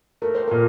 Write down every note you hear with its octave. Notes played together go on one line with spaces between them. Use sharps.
A3 A#4
C5
A#2 A#4